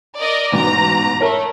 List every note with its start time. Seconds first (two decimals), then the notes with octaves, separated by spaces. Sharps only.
0.19 A#4 D5 D#5
0.52 A1 G#2 B2 A#5
1.21 A3 A#4 C#5